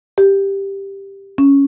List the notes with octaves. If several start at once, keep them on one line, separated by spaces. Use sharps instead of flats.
G4
C#4